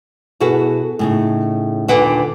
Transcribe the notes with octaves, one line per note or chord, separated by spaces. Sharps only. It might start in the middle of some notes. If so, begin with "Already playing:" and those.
B2 E4 F#4 G#4 A4
A2 C#3 D#4
D#2 A#2 D3 B4 F#5 G5